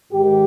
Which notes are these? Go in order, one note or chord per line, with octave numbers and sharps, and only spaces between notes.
G#2 D#3 G4